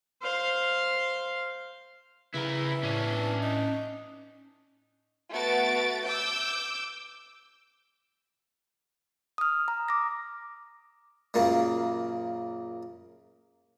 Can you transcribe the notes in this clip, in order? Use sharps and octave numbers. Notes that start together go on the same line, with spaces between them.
C5 F5
C#3 E3 E4 A#4
A2 C#4 D4
D#4
A3 B3 F#4 A6 D7
D6 E6 G6
D#6 F6
A#5
D6 A#6
F#2 A#2 C#3 A#3